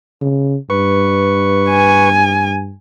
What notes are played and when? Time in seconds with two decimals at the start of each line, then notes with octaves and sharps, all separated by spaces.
0.21 C#3
0.70 G2 B4 C#6
1.70 G#5